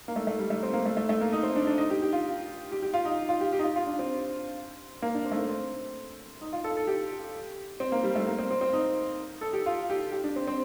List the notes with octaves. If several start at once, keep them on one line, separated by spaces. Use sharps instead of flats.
A#3
A3
A3
G3
A3
C4
A#3
A3
A3
A3
A#3
D#4
C4
D4
D4
D#4
G4
G4
F4
G4
G4
F4
D#4
F4
G4
G4
D#4
F4
F4
D4
C4
A#3
D4
C4
A3
A#3
C4
D#4
F4
A4
A4
G4
C4
A#3
G3
A3
A#3
C4
C4
C4
D#4
A4
G4
F4
G4
G4
D4
C4
C4